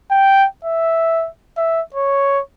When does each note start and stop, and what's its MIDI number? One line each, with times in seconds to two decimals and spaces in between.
0.11 0.46 79
0.65 1.28 76
1.57 1.81 76
1.94 2.40 73